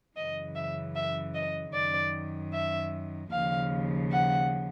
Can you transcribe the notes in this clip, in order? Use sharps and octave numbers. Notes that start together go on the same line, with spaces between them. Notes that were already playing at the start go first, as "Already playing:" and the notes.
F#2 C#3 E3 D#5
E5
E5
D#5
F#2 D#3 D5
E5
D#2 C#3 F3 F5
F#5